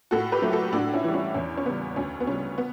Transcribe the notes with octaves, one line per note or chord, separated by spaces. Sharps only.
A2 F#4 A4
G4 B4
F#3 A3
F#4 A4
A2 D4 F#4
C#4 E4
E3 G3
C#4 E4
E2 C#4
C#4
C#3 G3 B3
D2 C#4
B3
C#3 G3 C#4
B3